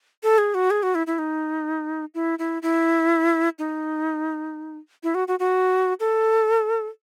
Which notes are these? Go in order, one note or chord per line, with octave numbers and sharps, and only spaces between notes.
A4
G#4
F#4
G#4
F#4
E4
E4
D#4
E4
E4
E4
D#4
E4
F#4
F#4
F#4
A4